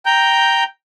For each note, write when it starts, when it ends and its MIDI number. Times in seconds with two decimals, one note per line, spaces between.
0.06 0.64 79
0.06 0.64 82
0.06 0.64 91